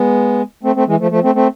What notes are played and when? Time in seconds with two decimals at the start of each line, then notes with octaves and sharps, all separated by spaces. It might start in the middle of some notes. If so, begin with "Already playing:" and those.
Already playing: G#3 B3
0.63 A3 C4
0.75 A3 C4
0.87 E3 G#3
1.00 F3 A3
1.11 F3 A3
1.23 A3 C4
1.35 A3 C4